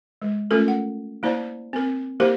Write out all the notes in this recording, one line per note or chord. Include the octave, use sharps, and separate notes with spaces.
G#3
A3 C#4 F4 A4 A#4
F#5
A#3 E4 C5 D5 A5
C4 A#4
A#3 E4 G4 A#4 C5